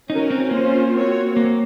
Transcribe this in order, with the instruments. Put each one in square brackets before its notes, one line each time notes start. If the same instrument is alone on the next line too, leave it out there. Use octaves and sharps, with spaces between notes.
[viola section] C#4 F#4 A#4 [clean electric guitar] D#4
[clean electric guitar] C4
[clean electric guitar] A#3 [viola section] C#4 F4 C5
[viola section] C4 F#4 C#5
[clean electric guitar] A#3